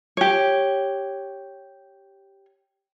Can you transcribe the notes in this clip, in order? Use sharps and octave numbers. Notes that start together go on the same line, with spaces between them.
G4 C#5